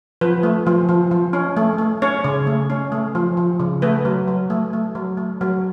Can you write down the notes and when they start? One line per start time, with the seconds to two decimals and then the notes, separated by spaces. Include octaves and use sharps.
0.21 F3 B4
0.43 A3
0.67 F3
0.89 F3
1.11 F3
1.33 C#4
1.57 A3
1.78 A3
2.02 C#4 C#5
2.24 C#3
2.47 A3
2.70 C#4
2.92 A3
3.15 F3
3.37 F3
3.60 C#3
3.82 A3 B4
4.05 F#3
4.28 F#3
4.50 A3
4.73 A3
4.95 F#3
5.17 A3
5.41 F#3